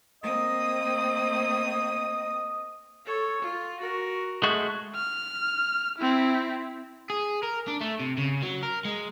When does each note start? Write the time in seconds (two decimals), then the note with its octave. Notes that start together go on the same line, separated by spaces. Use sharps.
0.23 A#3 C4 D#5 D#6
3.05 A4 C#5
3.42 F4
3.81 F#4 A#4
4.43 G#3 A3 F#4
4.96 F6
5.99 C4 E4
7.10 G#4
7.43 A#4
7.68 D4
7.81 A3
8.00 C3
8.18 C#3
8.43 F#3
8.63 A#4
8.85 G#3